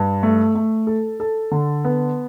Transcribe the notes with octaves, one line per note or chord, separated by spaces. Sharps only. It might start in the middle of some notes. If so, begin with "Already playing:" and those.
Already playing: G2
A3
A3
A4
A4
D3
B3